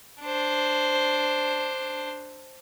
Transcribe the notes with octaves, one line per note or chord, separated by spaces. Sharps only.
D4 C5